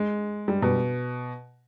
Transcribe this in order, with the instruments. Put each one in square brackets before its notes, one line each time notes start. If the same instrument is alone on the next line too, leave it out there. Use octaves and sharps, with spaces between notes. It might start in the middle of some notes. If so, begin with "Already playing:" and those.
Already playing: [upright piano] G#3
G3
B2